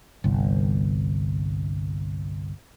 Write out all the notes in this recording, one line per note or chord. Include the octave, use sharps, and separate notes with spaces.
G1 C2